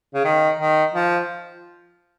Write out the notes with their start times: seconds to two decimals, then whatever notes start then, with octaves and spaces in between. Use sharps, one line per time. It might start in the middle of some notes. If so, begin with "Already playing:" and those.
0.14 C#3
0.25 D#3
0.60 D#3
0.94 F3